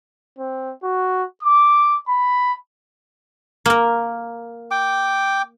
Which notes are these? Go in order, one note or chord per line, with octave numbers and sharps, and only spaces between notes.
C4
F#4
D6
B5
A#3 A#4
G5 D6